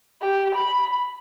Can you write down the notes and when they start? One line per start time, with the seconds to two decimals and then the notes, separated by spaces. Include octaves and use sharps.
0.22 G4
0.55 B5